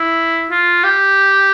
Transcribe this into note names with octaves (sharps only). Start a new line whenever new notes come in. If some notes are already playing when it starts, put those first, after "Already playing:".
Already playing: E4
F4
G4